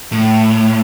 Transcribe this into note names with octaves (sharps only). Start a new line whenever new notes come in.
A2